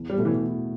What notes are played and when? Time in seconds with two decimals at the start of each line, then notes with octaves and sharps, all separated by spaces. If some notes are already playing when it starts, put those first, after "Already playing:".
Already playing: E2
0.10 G3
0.18 B2 A3 E4
0.25 E3